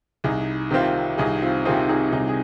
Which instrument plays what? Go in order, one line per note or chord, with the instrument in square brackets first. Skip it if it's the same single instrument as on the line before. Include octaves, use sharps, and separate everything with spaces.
[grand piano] C2 [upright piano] D#4 G#4
[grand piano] C3 D#3 C4 F4
[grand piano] C2 [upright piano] D#4 G#4
[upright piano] C4 F4
[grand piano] C3 D#3 C4 F4 [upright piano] D#4 G#4
[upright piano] D#4 G#4
[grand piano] C2 [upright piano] D#4 G#4
[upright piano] G#4